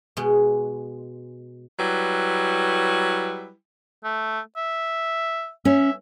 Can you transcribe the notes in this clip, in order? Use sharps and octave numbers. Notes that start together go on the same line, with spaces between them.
B2 G#3
F#3 G3 E4 B4
A3
E5
C#4 E5